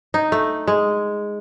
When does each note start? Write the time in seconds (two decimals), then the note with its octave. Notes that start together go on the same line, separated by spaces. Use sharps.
0.14 D#4
0.32 A3
0.67 G#3